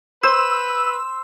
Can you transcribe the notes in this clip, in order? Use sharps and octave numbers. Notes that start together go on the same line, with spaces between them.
B4 C5 E6